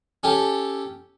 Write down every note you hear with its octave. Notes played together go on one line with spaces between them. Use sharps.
C#4 G4 A4